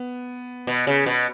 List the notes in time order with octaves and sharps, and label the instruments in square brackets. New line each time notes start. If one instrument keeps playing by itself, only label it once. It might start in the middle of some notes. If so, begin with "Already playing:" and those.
Already playing: [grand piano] B3
[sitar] B2
C#3
B2